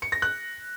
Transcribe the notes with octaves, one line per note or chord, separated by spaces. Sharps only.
C#7
A#6
F#6